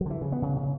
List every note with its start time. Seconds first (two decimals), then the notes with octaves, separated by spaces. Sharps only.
0.01 F#3
0.06 D3
0.10 E3
0.21 C#3
0.32 B3
0.42 C#3
0.57 C#3